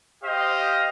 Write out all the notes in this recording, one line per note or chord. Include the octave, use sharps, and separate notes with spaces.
G4 C5 D#5 F5